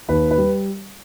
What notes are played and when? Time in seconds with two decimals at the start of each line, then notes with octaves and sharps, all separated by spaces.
0.09 D#2 B4
0.31 B4
0.38 G3